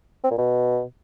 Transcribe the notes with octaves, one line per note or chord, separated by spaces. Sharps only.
C4
A#2
B2